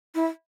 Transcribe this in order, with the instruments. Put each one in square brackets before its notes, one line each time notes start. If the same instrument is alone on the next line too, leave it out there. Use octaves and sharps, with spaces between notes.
[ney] E4